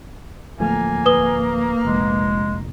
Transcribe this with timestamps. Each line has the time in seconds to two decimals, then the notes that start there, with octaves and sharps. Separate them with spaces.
0.60 D1 F3 A3 A#3 G#5
1.06 B4 D#6 G7
1.85 F1 A#1 G#3